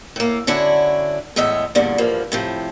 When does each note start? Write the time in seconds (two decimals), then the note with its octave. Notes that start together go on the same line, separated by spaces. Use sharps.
0.16 A2 A#3
0.47 D3 C#4 D4 E4 F#4
1.36 E2 A2 G#3 D#5 E5
1.75 E2 G2 A#2 D3
1.98 E2 G2 F3 A#3
2.32 A2 C3 F3